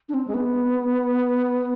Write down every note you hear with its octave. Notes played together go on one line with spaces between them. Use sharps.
D4
C4
G#3
B3